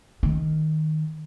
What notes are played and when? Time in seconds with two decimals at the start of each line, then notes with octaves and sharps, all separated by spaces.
0.23 D#3